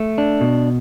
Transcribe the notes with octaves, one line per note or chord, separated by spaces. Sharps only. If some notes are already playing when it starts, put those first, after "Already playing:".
Already playing: A3
D4
B2